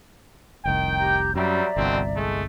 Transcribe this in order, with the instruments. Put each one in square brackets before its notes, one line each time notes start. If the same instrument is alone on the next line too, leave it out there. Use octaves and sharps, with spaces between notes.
[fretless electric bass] F1 C2 [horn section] D#3 G5
[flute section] G4 A#5 G6
[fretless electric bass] F#2 [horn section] F#3 G3 C4 [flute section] D5 E5 A#5
[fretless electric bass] G1 C2 [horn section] B2 D3 C4
[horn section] G#3 A3